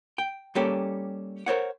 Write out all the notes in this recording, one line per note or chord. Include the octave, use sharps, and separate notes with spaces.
G5
G3 A#3 C#4 G4 A4
A#4 C5 C#5 F#5